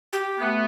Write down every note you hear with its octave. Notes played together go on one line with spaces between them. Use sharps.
G4
A3 B3